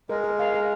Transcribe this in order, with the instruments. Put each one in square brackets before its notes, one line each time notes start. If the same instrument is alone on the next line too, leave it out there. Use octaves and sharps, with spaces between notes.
[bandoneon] G#3 [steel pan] A#4
[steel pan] A#4
F5
A#4